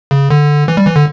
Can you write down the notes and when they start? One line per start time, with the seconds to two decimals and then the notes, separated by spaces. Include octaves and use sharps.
0.11 C#3
0.31 D3
0.68 E3
0.77 G3
0.87 E3
0.96 D3